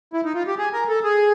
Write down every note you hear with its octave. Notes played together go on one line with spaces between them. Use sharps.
E4
D#4
F4
G4
G#4
A#4
A4
G#4